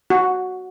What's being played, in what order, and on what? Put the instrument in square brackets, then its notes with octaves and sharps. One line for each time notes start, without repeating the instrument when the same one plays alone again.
[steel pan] F#4